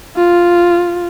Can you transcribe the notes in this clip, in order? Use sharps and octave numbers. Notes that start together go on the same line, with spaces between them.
F4